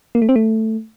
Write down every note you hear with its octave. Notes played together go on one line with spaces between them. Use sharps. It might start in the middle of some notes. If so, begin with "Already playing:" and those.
A#3
A3
C4
A3